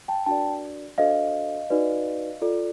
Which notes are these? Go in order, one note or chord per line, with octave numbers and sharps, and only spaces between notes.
G5 A5
D4 F#4 A#4 D5 G5 A5
D4 F#4 A4 C5 D#5 F5
D#4 F#4 B4 D5
F4 A4 D5